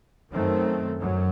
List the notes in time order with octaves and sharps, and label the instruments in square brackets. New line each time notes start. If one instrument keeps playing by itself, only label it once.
[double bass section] F#2 D#3 A3 C4
F#2 F#3